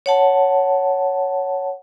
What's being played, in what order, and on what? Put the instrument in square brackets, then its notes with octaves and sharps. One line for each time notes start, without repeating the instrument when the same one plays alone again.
[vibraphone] C#5 F#5 A5